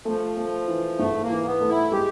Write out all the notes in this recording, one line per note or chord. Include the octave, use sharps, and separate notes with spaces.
F3 A3
A3
E3
G#2 A3
A#3
E3
B3
A3
E4
G#3 G4